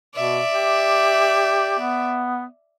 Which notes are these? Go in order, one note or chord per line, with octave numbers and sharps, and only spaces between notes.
B2 D5 E5
G4
B3